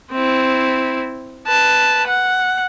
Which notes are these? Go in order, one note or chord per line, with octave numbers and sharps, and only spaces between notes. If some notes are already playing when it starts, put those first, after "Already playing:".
C4 E4
B4 A5
F#5